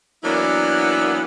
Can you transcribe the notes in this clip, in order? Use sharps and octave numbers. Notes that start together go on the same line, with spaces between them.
E3 F#3 A#3 B3 D4 E4